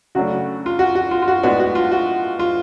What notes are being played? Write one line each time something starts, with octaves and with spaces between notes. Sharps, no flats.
C#3 F#3 A3 D4 F#4
F4
F#4
F#4
F4
F4
F#4
A2 G#3 B3 D4 F#4
F#4
F4
F#4
F4